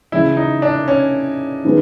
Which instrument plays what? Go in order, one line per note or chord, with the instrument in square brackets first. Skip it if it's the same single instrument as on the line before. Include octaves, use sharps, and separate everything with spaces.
[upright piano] C#3 E3 G#3 [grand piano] E4
[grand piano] D#4
D4
C#4
[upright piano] D#3 G#3 B3